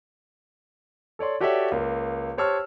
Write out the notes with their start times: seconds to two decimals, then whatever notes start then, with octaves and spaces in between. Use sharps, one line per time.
1.19 A4 C#5 D5 C6
1.41 F#4 G4 A4 C#5 D5 E5
1.72 C#2 A#3
2.38 G4 C5 C#5 A5 E6 F6